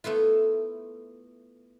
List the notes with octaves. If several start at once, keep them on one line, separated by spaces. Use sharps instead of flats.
A3 B3 E4 F4